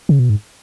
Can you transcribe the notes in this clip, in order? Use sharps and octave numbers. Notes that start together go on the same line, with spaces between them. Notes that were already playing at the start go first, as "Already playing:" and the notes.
C#3
B2
G#2